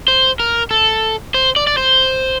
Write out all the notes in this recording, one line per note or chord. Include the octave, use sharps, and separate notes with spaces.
C5
A#4
A4
C5
D5
D5
C5